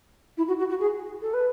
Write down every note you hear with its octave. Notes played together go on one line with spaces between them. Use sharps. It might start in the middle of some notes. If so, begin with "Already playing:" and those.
E4
F#4
F#4
F#4
G#4
A4
B4